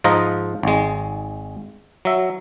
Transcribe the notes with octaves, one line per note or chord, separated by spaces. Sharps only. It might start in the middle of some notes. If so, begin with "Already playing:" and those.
G#2 F3 F4 D#5 A#5
G#1 G#3
F#3 E5